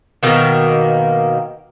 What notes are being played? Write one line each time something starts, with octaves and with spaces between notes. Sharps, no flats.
B2 D#3 A#3